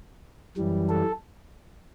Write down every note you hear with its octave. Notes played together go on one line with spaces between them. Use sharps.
F#2 E3 G3
A4